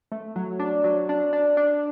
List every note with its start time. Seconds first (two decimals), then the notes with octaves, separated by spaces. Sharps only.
0.12 A3
0.36 F#3
0.59 D4
0.84 F#3
1.09 D4
1.33 D4
1.57 D4